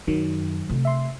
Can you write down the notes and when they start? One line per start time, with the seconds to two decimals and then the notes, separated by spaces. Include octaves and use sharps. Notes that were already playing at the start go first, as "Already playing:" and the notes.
0.07 F#2 D#3 F#3
0.69 C3 A3
0.85 E5 C6